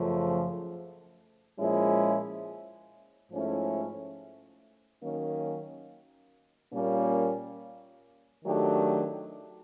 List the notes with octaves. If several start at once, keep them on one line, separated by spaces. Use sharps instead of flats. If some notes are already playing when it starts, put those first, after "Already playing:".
Already playing: F#2 C#3 F3 A3
A#2 F3 G#3 C#4 E4
G#2 F3 A3 C#4 E4
D#3 F#3 A#3 C#4
A#2 G3 A#3 C#4
D#3 F#3 A3 D4 G4